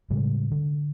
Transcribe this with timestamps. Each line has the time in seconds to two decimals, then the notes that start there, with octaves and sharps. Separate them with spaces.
0.10 A2 C#3 G3 G#3
0.51 D3